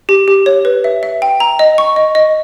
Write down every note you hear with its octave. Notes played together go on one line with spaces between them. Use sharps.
G4
G4
C#5
B4
E5
E5
G5
A#5
D#5
C#6
D#5
D#5